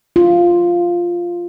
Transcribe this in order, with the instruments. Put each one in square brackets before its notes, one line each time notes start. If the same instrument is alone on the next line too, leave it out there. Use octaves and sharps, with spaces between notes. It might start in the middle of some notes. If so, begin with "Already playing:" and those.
[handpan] F4